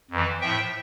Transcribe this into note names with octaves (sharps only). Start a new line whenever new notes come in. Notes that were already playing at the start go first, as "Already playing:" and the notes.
F2 E3
A2 F3 E5 G5